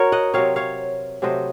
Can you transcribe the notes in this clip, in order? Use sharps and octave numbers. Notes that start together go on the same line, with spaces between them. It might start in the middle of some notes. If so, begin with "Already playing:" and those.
Already playing: F#4 A#4 C#5
D#5 F#5
C3 F#3 C4 C#5 F5
C#5 F5
C3 F#3 A3 C5 D#5